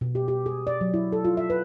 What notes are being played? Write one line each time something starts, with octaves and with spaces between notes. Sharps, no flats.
B2
G4
G4
G#4
D5
F#3
E4
A4
F4
E5
B4